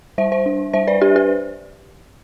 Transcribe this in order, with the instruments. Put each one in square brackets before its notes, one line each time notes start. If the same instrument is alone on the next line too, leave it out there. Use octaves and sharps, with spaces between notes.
[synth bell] G3 C5 E5
C5 E5
D4
G3 C5 E5
B4 D5
D4 G4 B4
G4 B4